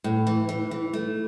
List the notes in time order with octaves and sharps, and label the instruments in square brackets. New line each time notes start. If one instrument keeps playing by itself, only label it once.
[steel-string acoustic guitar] A2
E3
E3
E3
A3